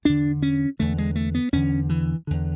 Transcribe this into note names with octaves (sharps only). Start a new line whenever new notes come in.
E2 D3 D4
C#4
E2 D3 A3
G#3
A3
B3
E2 D3 C#4
E3
E2 D3